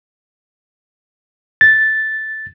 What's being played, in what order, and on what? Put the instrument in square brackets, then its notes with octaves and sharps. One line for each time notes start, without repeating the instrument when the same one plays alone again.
[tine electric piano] A6